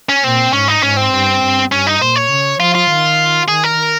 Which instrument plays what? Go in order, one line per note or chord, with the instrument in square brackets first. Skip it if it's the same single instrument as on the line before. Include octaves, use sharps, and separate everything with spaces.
[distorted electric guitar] C#4
[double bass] A#2 [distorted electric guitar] C4
[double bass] G#2 [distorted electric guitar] C#4
[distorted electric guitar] D#4
[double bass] G#2 [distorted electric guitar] C#4
[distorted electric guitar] C4
[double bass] G2
G2
[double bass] G2 [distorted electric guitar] C#4
[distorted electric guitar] D#4
[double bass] A#2 [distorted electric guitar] C5
[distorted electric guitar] C#5
[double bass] C#3
[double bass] F3 [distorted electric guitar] F4
[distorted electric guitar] F4
[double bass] D#3
[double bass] D#3 [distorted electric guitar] G#4
[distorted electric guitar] A#4